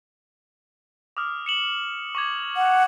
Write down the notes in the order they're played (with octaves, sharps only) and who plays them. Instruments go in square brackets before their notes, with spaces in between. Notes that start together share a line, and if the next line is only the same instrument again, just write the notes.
[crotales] D6 D#6 F6
C#7 E7 F#7
C#6 D6 G#6
[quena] F#5